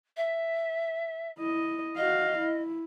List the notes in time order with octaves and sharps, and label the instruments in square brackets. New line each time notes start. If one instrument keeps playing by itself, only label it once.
[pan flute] E5
[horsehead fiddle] E4 D#5
[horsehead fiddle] F#4 F5 [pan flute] D#5
[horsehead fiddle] E4